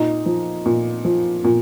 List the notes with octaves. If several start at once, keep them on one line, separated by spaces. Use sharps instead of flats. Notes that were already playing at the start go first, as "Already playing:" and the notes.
Already playing: A#2 D#4
F3
A#2
F3
A#2